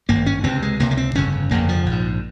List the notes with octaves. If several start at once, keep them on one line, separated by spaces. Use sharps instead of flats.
G#1 G2 A#3
C#4
C#2 C3 C4
G#3
C#2 C3 A#3
A#3
C4
G1 F2 C#3 C#4
G1 F2 C#3 A#3
F3
A#1 G#2